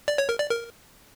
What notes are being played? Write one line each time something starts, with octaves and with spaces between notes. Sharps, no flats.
D5
C#5
A#4
D5
A#4